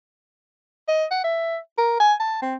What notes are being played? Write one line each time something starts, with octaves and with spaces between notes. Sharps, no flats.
D#5
F#5
E5
A#4
G#5
A5
C4